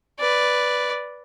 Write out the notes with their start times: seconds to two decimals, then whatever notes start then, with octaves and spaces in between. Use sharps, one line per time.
0.19 B4 D5